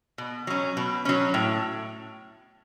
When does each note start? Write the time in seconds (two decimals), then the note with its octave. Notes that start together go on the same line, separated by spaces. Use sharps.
0.18 B2
0.47 F#3 C#4
0.77 B2
1.05 F#3 C#4
1.34 A2